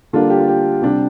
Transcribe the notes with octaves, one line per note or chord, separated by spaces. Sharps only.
D3 G3 A#3 D4 F4 A4
G4
F4
G4
C3 G3 D4